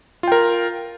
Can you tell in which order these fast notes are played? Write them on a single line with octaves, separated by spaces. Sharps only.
F4 G5 A#4